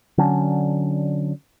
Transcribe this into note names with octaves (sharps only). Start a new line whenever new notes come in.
D3 F#3 C#4 D4